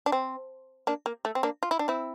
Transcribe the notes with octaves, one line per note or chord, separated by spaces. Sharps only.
D4
C4
A#3 D4
A#3
A3
C4
A#3 D4
F4
E4
D4
C4 E4